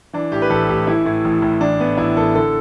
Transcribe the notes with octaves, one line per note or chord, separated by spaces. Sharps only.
E3 D4
A2 G4
B4
A1 A4
A1 G4
E3 E4
A2
A1
A1
E3 D4
A2 B3
A1 E4
A1 A4
D3 A4